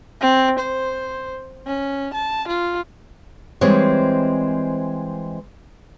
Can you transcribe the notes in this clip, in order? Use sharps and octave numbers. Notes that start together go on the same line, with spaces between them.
C4
C5
C#4
A5
F4
E3 G3 G#3 C4 C5 C#5